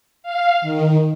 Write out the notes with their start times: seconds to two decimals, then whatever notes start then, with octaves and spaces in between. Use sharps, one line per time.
0.23 F5
0.62 D#3